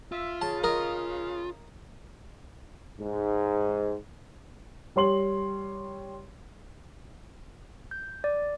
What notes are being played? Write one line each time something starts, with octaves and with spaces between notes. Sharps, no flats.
F4 E5
C#3 A5
A#4 D#5
G#2
G3 C#5 C6 F#7
G6
D5